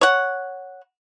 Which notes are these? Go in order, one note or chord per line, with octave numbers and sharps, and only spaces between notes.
C#5 F#5